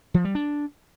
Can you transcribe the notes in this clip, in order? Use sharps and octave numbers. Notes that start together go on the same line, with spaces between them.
F3
G3
D4